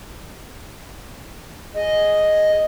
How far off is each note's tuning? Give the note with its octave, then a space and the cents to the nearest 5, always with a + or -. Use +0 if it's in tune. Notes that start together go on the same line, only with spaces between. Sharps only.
G#4 +0 D#5 +0